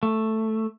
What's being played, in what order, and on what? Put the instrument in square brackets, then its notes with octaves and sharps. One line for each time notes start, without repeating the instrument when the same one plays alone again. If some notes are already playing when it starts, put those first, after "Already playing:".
[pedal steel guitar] A3